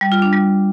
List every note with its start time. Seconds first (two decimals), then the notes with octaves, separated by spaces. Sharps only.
0.01 G3
0.12 F4
0.22 D4
0.33 G3